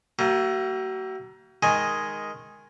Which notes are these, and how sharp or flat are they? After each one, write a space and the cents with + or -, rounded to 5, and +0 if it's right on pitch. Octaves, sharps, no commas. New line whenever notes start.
F#3 +40 A#3 -40
D#3 +5 G#3 +0 G#5 +0